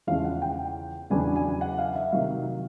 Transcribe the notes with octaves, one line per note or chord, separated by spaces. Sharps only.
E2 C#3 F3 G#3 C#4 F5
F#5
G5
E2 C#3 F#3 B3 D4 G#5
G#5
F#5
F5
E5
C3 D#3 F#3 F5